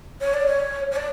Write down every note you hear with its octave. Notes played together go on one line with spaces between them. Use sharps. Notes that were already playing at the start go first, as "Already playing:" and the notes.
C#5
D5
C#5
C#5
D5